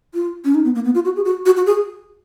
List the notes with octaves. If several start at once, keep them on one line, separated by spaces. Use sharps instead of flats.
F4
C#4
D#4
B3
A#3
B3
F4
F#4
G#4
F#4
F#4
F#4
G#4